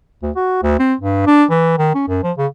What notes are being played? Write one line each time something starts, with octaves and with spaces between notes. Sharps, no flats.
D2
F#4
D2
C4
G2
D4
E3
D#3
C#4
F#2
F3
C#3